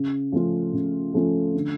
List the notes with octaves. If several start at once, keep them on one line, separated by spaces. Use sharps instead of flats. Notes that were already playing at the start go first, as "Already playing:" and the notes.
Already playing: C#3
F3 A3 C#4 F4
C#3
F3 A3 C#4 F4
D3